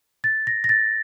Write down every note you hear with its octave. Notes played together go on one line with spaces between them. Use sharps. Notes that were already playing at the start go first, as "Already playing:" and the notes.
A6
A#6
A#6
A6